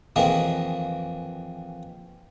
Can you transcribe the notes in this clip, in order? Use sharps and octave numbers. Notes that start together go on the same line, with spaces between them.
F2 D#3 E3 G#3 A#3